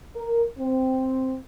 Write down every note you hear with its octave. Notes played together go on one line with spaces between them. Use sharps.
A#4
C4